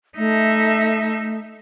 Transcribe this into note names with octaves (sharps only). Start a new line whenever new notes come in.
A3 D#4 E5